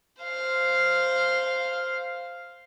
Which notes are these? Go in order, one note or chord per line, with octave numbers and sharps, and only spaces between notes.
C5 F5